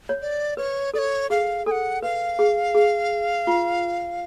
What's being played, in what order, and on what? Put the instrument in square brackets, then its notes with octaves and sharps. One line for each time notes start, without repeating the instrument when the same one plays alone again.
[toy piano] C#5
[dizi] D5
[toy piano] B4 [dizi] C#5
[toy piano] A4 [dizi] D5
[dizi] C#5
[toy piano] G#4 [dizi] F5
[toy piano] A4 [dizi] F#5 G#5
[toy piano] B4 [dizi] F5
[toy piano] G#4
G#4
F4